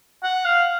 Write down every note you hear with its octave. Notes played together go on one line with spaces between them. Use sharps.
F#5
F5